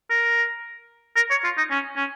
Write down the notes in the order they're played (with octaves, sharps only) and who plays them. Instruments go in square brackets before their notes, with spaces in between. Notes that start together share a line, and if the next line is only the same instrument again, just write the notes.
[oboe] A#4
A#4
C#5
F4
D#4
C#4
C#4